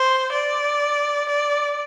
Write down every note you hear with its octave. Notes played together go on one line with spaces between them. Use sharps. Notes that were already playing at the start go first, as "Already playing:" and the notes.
Already playing: C5
D5
D5